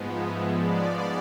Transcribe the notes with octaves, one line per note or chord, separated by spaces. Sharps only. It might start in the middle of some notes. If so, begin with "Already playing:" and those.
Already playing: G#2 F3 G#3 B3
E5
D5